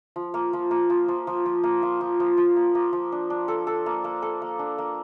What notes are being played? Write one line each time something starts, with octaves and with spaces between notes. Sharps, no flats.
F3
A#3
F3
A#3
F3
F3
F3
F3
A#3
F4
F3
F3
F3
A#3
A#3
F3
D4
D4
A4
A4
A#3
A#3
A4
A#3
D4
A#3